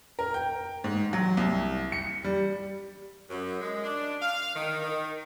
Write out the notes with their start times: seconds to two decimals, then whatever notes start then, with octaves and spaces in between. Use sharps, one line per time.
0.19 A#4
0.34 G5
0.84 G#2
1.13 F#3
1.37 C2
1.92 C#7
2.24 G3
3.30 F#2
3.60 G#3
3.84 D4
4.21 F5
4.56 D#3
4.82 D#3